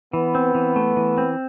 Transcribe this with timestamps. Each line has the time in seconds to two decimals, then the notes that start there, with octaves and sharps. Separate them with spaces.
0.13 E3 B3
0.35 C4
0.55 E3
0.76 A3
0.97 E3
1.18 C4